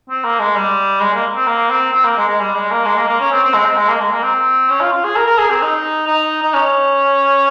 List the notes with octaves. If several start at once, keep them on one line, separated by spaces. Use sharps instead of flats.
C4
A#3
G#3
G3
G#3
A#3
C4
A#3
C4
C4
A#3
G#3
G#3
G3
G#3
A#3
G#3
A#3
A#3
C#4
C4
C4
G#3
C4
G#3
A#3
G#3
A#3
C4
C#4
F4
F4
G#4
A#4
A#4
G#4
C4
D#4
D#4
D#4
C#4